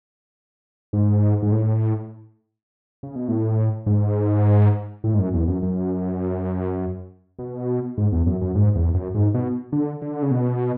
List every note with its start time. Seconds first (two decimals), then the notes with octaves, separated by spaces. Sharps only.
0.93 G#2
1.42 G#2
1.52 A2
3.03 C#3
3.16 B2
3.28 A2
3.86 G#2
5.04 A2
5.14 G#2
5.19 F#2
5.34 E2
5.48 F#2
5.62 F#2
7.39 B2
7.98 G#2
8.12 E2
8.26 F#2
8.41 F#2
8.55 G#2
8.76 E2
8.94 F#2
9.15 G#2
9.34 B2
9.72 D3
10.02 D3
10.23 C#3
10.31 B2